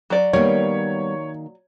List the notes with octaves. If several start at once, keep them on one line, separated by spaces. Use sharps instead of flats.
F#3 D5
D#3 G3 A#3 B3 C#5